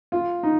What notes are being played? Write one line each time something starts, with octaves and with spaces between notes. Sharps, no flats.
F4
D#4